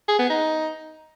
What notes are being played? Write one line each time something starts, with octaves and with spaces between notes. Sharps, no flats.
G#4
B3
D#4